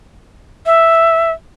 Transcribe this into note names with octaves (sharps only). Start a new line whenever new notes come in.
E5